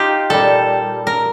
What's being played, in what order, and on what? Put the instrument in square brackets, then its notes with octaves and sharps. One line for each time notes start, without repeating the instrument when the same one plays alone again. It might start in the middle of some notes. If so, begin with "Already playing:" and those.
Already playing: [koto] D#4 F4 G4
A#2 G3 A4
A#4